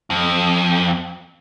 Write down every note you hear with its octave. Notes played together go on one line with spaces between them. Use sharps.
F2